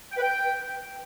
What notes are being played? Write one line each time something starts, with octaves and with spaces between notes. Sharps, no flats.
G5
B4
G5